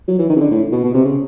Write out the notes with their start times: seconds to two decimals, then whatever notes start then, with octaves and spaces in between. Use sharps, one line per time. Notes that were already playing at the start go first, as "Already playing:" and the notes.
0.08 F#3
0.19 E3
0.29 D#3
0.36 C#3
0.41 D3
0.51 A2
0.72 B2
0.84 B2
0.94 C3
1.05 C#3